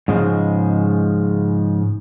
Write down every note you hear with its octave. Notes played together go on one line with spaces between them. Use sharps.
G#2 C#3 F3 G#3